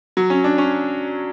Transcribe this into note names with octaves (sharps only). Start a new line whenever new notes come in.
F#3
C#4
D4
C#4